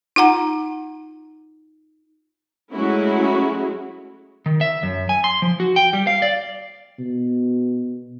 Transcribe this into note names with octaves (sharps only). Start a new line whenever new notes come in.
D#4 F4 F#5 A#5
F#3 G#3 A3 C#4 E4 F#4
D#3
E5
F#2
G#5
C6
F3
F#4
G5
G3
F5
D5
B2